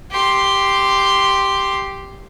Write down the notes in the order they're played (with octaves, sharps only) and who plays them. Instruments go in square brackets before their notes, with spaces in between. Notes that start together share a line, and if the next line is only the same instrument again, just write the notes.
[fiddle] G4 C6